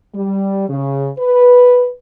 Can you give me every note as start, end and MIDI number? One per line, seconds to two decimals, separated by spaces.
0.15 0.64 55
0.69 1.07 49
1.19 1.90 71